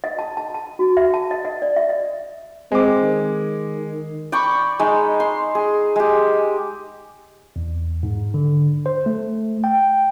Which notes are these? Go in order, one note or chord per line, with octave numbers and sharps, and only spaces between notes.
D#5
A5
A5
A5
F#4
E5
A5
D#5
D#5
D5
E5
D#5
G#3 C4 D6
D#3
D5 G5 B5 C#6
G#3 D#4
C6
G#4
G#3 G4
E2
G#2
D3
C5
A3
G5